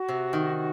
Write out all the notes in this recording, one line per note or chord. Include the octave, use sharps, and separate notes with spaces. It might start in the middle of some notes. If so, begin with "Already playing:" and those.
Already playing: F#4
C3
D#3